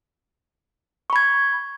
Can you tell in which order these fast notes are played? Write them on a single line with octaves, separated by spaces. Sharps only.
C#6 B5 G#6